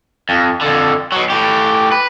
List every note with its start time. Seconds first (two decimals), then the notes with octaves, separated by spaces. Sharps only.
0.29 F2
0.61 F2 D3
1.12 B2 F#3
1.30 A2 G4
1.92 B4